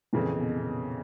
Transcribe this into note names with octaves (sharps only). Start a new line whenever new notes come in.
F2 A#2 C#3 E3
B2
B2